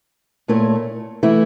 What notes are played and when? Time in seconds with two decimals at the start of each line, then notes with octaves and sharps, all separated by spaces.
0.48 A#2 A3 E4 A#4 C#5
1.23 E3 A3 E4